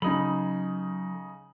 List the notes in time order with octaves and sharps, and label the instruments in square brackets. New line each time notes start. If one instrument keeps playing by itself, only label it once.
[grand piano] C#3 D#4 F#7 [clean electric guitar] F#3 A4 B5